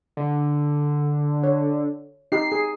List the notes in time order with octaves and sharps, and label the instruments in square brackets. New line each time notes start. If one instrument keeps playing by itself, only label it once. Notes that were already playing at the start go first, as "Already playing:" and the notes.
[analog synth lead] D3
[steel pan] C#5
[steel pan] D#4 G4 [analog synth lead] C7
[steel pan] G#4